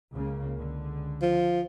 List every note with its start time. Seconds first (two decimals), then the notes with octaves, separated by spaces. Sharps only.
0.13 C#2 C#3 A#3
0.57 C#2 D3
1.22 F3